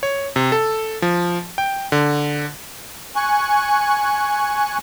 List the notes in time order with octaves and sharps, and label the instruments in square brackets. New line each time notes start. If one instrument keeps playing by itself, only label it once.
[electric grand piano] C#5
C3
A4
F3
G5
D3
[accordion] G#5 C#6 F#6